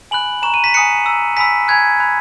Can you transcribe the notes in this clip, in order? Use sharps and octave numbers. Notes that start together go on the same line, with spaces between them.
G#5 B5 F#6 F#7
A#5 C#6 F#6 E7
D#7
B6
G#5 D#6 F#6 C#7
A#5 E6
G#5 B5 E6 B6
G#5 B5 F#6 G#6
B5 F#6